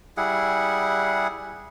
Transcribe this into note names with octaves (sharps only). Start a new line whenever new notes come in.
G3 E4 G#4 F#5